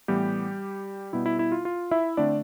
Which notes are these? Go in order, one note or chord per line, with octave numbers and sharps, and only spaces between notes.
A2 E3 G3 B3 G4
B2 G3 B3 E4
E4
E4
F4
F4
E4 E5
D3 A3 C4 D4 D5